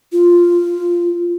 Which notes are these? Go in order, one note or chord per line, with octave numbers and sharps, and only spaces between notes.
F4